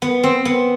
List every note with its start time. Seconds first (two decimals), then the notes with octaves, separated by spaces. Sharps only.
0.02 B3
0.23 C4
0.45 B3